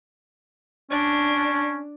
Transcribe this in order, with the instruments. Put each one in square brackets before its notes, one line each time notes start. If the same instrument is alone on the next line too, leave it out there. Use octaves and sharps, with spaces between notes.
[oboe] C#4 [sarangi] D4